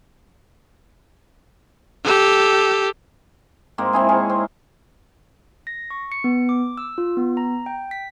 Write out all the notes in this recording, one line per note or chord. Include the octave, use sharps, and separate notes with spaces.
G4 A4
G#2 A#3 C4
C4 E4 G#4
E4 G#4 A#4 C#5
C4
A#6
C#6
C#7
B3
D6
E6
F4
B3
A#5
G5
B6